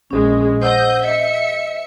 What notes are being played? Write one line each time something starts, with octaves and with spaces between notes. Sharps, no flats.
A#1 G#3 C#4
C5 D#5 F#5 E6 G6
D#5 E5 C#7